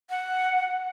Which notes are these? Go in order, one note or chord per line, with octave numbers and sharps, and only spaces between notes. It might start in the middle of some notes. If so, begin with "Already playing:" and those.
F#5